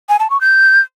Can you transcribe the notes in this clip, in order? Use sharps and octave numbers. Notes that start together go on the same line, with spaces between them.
G#5
A5
C#6
G6